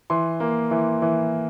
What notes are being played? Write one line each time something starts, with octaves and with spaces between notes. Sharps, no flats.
E3 C6
A#3
E3
E3